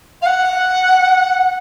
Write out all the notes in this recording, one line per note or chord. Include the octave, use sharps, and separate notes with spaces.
F5
F#5